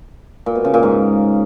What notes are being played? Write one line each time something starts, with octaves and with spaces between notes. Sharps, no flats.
A#2
B2
C#3
A#2
G#2